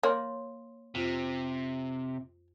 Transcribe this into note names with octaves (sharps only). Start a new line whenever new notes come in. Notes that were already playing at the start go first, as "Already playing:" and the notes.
A#3 C#5 D#5 C6
F2 C3 F4 C5